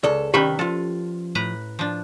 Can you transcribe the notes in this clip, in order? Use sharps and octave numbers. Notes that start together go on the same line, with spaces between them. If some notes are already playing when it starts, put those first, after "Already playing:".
C#2 A4 D5
C2 D#3 C#4 G4 B4 E5 G5 B5
F3 F4 A4
A2 B4 A#5
F3 D4